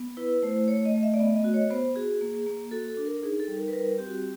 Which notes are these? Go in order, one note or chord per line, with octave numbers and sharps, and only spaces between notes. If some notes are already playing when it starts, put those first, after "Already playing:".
Already playing: B3
E4 B4
A3 C5
A3 C#5
D#5
A3
E5
D5
B3 D#5
D#5
F#4
C#5
B3 C5
F#4 G#4
A#3
A#3
F#4 A4
A4
D4
A#4
D#4 G#4
A4
G3
A#4
B4
G3 A#4
C4 G4
F#4
G4